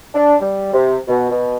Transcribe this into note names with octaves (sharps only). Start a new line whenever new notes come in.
D4
G3
C3
B2
B2